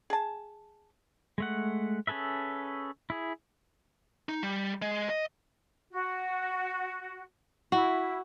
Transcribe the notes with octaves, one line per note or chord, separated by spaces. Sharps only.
G#4 A5
G#3 A3 F#5
C#4 G#4 A4 B4 E5
E4 G#4
D#4
G3
G#3
D#5
F#4
E4 F#4